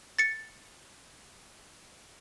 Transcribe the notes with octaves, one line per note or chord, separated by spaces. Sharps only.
A6 C#7